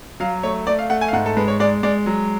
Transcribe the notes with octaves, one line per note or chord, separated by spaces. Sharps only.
F#3 F5
A3 C#5
A3 D5
F5
A3 F#5
G#5
F5
G#2 F#5
A4
G#3 B4
C#5
G#3 D5
G#3 D5
F#3